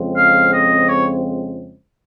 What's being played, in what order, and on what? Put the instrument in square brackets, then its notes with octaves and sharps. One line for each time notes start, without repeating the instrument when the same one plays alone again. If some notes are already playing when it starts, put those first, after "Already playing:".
Already playing: [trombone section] F2 C#3 F3 G#3 C4
[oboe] F5
D#5
C#5